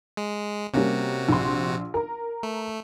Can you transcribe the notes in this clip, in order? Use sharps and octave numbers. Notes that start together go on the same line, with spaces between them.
G#3
C3 G3 A#3 C#4 F#4
A#1 C6
A#4 A#5
A3